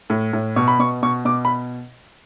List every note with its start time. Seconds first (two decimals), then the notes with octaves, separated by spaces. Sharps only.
0.10 A2
0.33 A2
0.56 B2 C#6
0.68 B5
0.79 B2 C#6
1.03 B2 C#6
1.25 B2 D6
1.45 B5